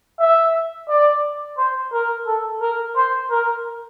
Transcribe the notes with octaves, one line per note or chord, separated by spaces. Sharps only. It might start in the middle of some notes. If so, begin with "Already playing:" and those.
E5
D5
C5
A#4
A4
A#4
C5
A#4